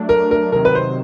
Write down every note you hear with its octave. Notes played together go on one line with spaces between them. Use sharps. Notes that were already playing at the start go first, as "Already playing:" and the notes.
Already playing: F#3 A3 D4
A#4
A#4
C3 D#3 F#3 A#4
B4
C5